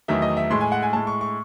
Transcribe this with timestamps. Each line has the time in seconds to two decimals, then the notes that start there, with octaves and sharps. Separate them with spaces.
0.08 E2 D#3 F#3 A3 E5
0.22 D#5
0.37 E5
0.51 A2 G#3 C6
0.61 G#5
0.72 F#5
0.83 G#5
0.93 A2 G#3 A5
1.07 C#6
1.21 C#6